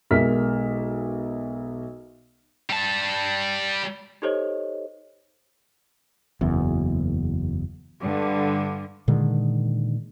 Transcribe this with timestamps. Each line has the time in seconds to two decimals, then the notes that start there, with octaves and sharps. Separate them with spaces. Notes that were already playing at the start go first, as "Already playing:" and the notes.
0.11 B1 G#3 A#4 E5 F6 B6
2.69 G3 A5
4.22 D#4 G4 A4 C5 C#5 D#5
6.41 F#1 E2
8.00 G2 D3
9.08 A#2 D3 D#3 G#3